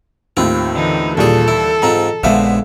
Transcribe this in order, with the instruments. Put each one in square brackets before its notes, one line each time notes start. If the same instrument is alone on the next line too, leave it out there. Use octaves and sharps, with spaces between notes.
[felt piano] D#2 A2 [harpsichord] C4 F4
[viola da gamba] D3 E3 D#4
[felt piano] D#2 G3 [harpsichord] A#2 G#4 [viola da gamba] A4
[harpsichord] E4
[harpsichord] G#2 C4 F4 [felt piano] A#5
[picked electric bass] A#1 F3 G#3 [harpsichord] D3 B3 C5 [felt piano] E5 F5